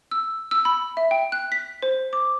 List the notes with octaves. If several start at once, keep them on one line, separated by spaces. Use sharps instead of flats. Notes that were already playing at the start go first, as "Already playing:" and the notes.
E6
E6
B5
E5
G5
F#6
B6
C5
D6